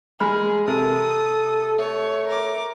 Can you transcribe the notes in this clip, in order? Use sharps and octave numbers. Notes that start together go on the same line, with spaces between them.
G#3 G#4 B5 F6
C3 A4 A#4 D#6
A3 C#5
A#4 D6